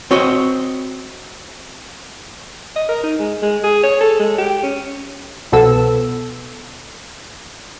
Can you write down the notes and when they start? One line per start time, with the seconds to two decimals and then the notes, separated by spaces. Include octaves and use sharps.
0.11 C4 F#4 C#5 D#5
2.76 D#5
2.89 A#4
3.03 D#4
3.19 G#3
3.42 G#3
3.63 G#4
3.83 C#5
4.01 A4
4.19 G#3
4.38 G4
4.63 C#4
5.52 C2 B2 F3 B3 A4 E6